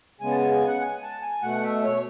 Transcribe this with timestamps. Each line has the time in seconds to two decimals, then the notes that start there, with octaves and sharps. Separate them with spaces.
0.21 C#3 G#3 B3 G#5
0.31 A5
0.36 G#5
0.51 G#5
0.67 F#5
0.81 G#5
0.96 G#5
1.02 A5
1.22 G#5
1.42 B2 A3 F#5
1.63 E5
1.84 C#5